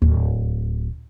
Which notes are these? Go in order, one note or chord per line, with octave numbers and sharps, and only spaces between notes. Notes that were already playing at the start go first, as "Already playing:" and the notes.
D1 D#2